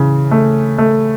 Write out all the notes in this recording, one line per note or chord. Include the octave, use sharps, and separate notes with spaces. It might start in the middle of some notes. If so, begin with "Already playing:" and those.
Already playing: C#3 E3
A3
A3